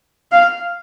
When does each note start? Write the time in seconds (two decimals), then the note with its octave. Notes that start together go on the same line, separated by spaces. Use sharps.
0.32 F5